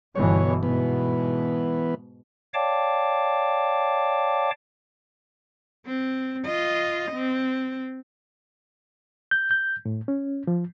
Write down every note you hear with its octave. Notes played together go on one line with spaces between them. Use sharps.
G1 B2 E3 C#5
G#2 B2 E3 B3
C#5 D5 F5 G5 A5 D6
C4
F4 D#5
C4
G6
G6
A2
C#4
F3